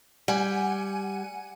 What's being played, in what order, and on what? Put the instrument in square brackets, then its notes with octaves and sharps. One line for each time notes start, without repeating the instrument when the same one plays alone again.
[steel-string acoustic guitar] G3 [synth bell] F#5 G#5